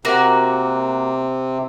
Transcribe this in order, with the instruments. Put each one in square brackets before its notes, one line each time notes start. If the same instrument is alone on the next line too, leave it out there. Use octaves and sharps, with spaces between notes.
[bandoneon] C3 [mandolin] A#3 F#4